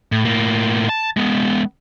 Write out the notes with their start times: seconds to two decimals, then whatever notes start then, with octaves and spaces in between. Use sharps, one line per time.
0.12 A2
0.25 A2 A#3
0.89 A5
1.17 G#3 B3